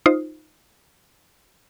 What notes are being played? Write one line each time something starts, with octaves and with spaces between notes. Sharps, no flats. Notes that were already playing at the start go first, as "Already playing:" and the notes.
D#4 F4 C5